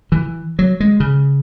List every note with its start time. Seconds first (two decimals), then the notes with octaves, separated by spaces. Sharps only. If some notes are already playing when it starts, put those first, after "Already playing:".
0.12 E3
0.59 F#3
0.80 G#3
1.00 C#3